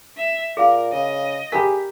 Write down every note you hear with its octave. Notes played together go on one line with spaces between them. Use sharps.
E5
A#2 G#4 A#4 F5
C#3 D#5
G4 G#4 A#4 A#5 B5 B6